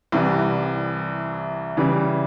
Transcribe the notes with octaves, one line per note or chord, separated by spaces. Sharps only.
C2 C3 E3 G3
C#3 E3 G3